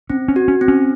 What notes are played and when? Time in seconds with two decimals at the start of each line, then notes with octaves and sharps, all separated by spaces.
0.10 C4 C#4
0.28 C#4
0.36 F#4
0.48 C#4
0.61 C4
0.68 C#4